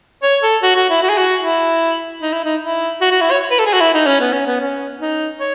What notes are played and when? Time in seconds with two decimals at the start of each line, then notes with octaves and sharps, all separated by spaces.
0.23 C#5
0.43 A4
0.62 F#4
0.76 F#4
0.90 E4
1.03 F#4
1.10 G#4
1.18 F#4
1.42 E4
2.22 D#4
2.33 E4
2.44 D#4
2.62 E4
3.01 F#4
3.11 F#4
3.21 E4
3.31 C#5
3.51 B4
3.59 A4
3.66 G#4
3.73 F#4
3.81 E4
3.94 D#4
4.07 C#4
4.21 B3
4.33 C#4
4.47 B3
4.61 C#4
5.00 D#4
5.39 C#5